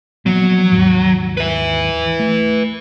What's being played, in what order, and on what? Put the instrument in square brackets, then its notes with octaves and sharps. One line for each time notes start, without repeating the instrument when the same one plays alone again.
[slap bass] F3 A#3 B3 [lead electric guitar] F#3
[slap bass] D#2 G#2
[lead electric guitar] B4 E5
[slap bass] A3